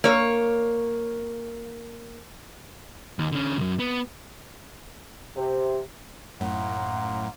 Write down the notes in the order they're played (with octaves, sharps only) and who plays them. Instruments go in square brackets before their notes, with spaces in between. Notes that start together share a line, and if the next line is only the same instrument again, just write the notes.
[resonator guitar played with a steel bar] A#3 C#5
[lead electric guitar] D#2
D3 C#4
C2 F#2
B3
[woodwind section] C3
[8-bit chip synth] F#2 A2 [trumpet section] A#3 D#4 C6 [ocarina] F#5